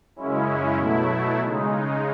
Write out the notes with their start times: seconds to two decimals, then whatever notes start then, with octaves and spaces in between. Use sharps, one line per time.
0.16 F#2 C#3 G#3 C#4 E4
0.77 B2 F#3 A3 E4
1.39 C#3 G#3 D#4